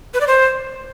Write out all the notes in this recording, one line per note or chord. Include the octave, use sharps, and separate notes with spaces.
B4
D5
C5